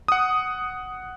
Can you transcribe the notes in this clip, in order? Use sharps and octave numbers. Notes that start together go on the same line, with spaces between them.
F#5 D#6